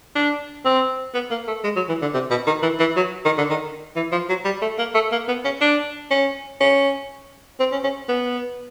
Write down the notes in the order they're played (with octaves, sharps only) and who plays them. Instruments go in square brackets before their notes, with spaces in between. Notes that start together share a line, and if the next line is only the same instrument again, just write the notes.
[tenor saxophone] D4
C4
B3
A#3
A3
G#3
F#3
E3
D3
C3
B2
D#3
E3
E3
F#3
D#3
D3
D#3
E3
F3
F#3
G3
A3
A#3
A3
A#3
B3
C#4
D4
C#4
C#4
C4
C#4
C#4
B3